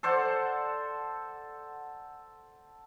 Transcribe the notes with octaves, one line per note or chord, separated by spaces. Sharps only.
A4 C5 D5 F#5